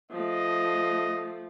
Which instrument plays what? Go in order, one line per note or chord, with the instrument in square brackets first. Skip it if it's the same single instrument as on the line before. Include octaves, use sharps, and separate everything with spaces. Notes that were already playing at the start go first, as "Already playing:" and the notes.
[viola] F3 A3 [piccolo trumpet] D#5